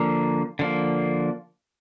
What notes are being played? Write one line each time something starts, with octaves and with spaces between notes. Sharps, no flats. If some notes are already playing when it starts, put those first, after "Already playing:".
Already playing: D3 F3 A#3
D3 F3 A#3